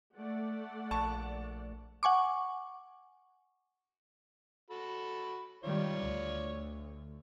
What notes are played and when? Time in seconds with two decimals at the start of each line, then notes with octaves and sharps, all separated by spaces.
0.14 A3 D5 F#5
0.91 A#1 A5 C#6
2.03 F#5 G#5 C#6 D6
4.70 F#4 A4 B5
5.64 D#3 G3 F4 C#5 D5
6.00 D2